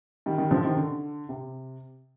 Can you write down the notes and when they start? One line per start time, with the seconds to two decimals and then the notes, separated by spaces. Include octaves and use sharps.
0.26 D#3 G3
0.38 D#3 G3
0.51 D3 F3
0.64 C3 D#3
0.77 D3
1.29 C3